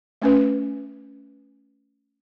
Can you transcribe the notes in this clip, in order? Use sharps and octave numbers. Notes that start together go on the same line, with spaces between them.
A3 C#4 B4